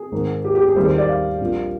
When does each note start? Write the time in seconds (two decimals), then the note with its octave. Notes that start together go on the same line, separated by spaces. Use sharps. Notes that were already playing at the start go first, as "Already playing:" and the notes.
Already playing: G#4
0.12 G#1 G#2 D#3 G#3
0.45 G4
0.55 G4
0.66 G#4
0.76 D#2 D#3 G3 C5
0.87 C5
0.98 D5
1.09 F5
1.40 A#1 A#2 G3